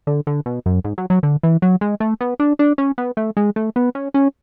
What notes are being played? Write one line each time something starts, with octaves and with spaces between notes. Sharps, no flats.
D3
D3
B2
F#2
G#2
F#3
F#3
D3
E3
F#3
G#3
A3
B3
D4
D4
C#4
B3
A3
G#3
A3
B3
C#4
C#4